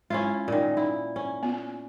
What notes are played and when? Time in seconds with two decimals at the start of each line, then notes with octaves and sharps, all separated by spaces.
0.10 G#3 C#4 E4 F4
0.48 A#2 D#3
0.77 D#4 E4
1.16 C#4
1.43 B3 F4